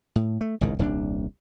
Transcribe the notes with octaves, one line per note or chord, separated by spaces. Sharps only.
A2
A3
G#1 C#2 A2 D#3
D#1 C2 C#4 D4